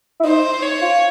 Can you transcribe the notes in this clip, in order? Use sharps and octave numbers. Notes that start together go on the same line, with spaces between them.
E4
D#4 C5
C#5
F4